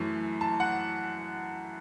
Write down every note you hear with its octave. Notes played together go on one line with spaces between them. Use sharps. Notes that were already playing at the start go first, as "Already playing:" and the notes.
Already playing: F#2 E3 A3
A5
F#5